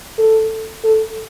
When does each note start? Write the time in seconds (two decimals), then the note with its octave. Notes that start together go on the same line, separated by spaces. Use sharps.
0.18 A4
0.84 A4